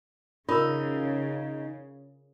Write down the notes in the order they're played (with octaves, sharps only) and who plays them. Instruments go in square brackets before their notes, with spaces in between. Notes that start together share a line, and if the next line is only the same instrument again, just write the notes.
[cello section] C#3 [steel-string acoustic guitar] D#4 [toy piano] F4 A#4 E6